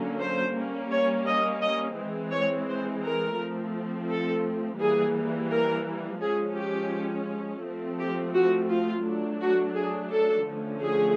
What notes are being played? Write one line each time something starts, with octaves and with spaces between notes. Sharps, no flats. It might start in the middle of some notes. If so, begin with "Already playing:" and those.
Already playing: D3 F#3 A#3 C#4
C5
G3 A#3 C#4
C#5
D#5
D#5
E3 G#3 C4
C#5
C5
A#4
F3 A3 C4
A4
E3 G3 A#3 G#4
A#4
F3 G#3 C#4 G#4
G4
F3 A3 C4
G4
F#4
F4
F#3 A3 D4
F#4
G#4
A4
D3 F3 A3 C#4
G#4